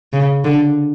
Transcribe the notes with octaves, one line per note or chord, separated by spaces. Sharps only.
C#3
D3